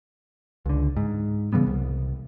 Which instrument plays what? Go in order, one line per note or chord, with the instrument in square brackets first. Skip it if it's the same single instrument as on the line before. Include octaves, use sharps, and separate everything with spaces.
[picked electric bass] C#2 D3
G#2
C#3 E3 G3 B3
C2